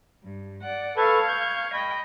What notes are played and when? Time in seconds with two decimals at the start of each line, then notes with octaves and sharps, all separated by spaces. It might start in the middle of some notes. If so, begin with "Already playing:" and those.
0.23 G2
0.62 D5 F#5
0.97 A4 B4 F5 C#6 G#6
1.28 G6
1.73 D#5 G5 B5